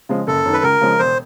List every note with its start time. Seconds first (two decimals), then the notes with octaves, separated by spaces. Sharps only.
0.09 C#3 F3 G#3
0.27 F#1 A4
0.45 F#2 D#3
0.53 B4
0.63 C#2 A#4
0.81 C#3 F3 G#3
0.99 E1 C5